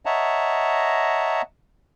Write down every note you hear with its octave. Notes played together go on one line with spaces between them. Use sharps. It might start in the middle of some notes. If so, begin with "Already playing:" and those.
C#5 D#5 E5 F#5 A5 A#5